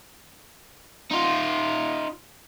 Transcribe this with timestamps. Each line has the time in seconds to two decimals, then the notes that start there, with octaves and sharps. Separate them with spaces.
1.11 D#4 F4